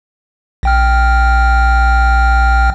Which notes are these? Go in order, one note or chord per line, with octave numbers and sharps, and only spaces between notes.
A#1 G5 F6